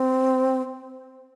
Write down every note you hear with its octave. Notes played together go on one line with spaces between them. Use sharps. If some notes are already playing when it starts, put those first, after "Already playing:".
Already playing: C4